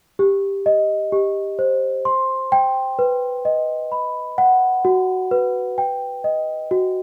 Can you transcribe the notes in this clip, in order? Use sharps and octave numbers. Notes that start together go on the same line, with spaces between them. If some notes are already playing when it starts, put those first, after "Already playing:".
G4
D#5
G4
C5
C6
G5
B4
D#5
B5
F#5
F#4
B4
G5
D#5
F#4